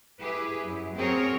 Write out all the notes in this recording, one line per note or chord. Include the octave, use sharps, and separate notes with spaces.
E4 G4 G#4 B4
F#2
C4 F#4 G#4 A#4 C#5